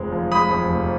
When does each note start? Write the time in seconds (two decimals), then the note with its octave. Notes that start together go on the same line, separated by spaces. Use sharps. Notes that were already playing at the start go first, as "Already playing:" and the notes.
Already playing: F1 F2 G#3
0.13 F3
0.32 G#3 B5 D#6
0.51 F2
0.70 F1